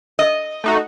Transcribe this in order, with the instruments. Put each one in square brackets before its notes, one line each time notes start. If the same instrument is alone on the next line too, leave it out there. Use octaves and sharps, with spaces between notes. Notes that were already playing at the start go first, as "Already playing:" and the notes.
[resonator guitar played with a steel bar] D#5
[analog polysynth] A3 D#4 F#4